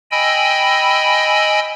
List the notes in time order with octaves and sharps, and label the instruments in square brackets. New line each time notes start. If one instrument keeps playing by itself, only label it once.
[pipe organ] D#5 G5 G#5 B5 E6